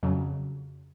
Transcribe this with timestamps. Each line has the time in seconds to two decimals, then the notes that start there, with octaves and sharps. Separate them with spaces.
0.03 F2 C#3 F#3